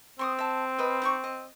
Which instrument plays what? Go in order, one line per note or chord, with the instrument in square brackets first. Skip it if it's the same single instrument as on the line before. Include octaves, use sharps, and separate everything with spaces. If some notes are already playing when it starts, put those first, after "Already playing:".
[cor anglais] C4 [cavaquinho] C6 C#6 D#6
[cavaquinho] E5 A5
B4 D#5
D#4 D5 C#6
D#5